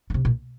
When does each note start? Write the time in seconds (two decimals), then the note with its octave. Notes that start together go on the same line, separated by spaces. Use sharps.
0.10 D3
0.14 C3
0.25 A#2